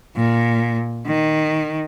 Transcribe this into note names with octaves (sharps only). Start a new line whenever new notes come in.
A#2
D#3